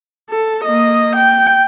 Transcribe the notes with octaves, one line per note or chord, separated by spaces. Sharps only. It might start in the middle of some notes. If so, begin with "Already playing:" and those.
A4
A#3 D#5
G5